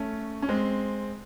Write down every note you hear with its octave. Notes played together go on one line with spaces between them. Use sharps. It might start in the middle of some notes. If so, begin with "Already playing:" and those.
Already playing: A3 C#4
C#4
G#3 C4